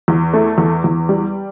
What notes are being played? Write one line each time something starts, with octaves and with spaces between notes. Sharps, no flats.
E2
A3
E2
E2
G3